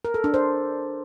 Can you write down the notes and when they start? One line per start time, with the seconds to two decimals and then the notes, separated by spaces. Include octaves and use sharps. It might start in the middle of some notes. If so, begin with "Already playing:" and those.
0.05 A#4
0.14 A4
0.24 D4
0.34 C5